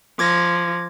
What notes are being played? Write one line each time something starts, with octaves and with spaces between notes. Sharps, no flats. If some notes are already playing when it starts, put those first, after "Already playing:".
F3 D6 G#6 A#6